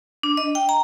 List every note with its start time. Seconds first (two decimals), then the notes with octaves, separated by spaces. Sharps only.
0.23 D4
0.37 D#5
0.55 G5
0.69 A#5